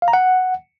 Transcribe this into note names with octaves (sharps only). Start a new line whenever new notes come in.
F5
A#5
F#5